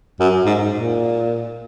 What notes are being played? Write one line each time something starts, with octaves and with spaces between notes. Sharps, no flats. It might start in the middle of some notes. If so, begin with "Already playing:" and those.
F#2
G#2
A#2